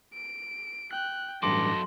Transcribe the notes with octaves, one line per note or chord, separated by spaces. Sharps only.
D7
G5 F#6
A1 G2 F#3 A4 C6 D6 A#6